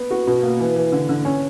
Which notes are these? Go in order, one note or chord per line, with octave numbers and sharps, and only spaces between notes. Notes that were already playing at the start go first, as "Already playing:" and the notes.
Already playing: B3
F#4
B2
A#3
E3
E3
D3
D3
C#4